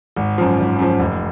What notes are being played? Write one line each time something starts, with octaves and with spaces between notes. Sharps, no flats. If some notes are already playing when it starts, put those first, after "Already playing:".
G#1
F#2 F3
G#1
F#2 F3
F1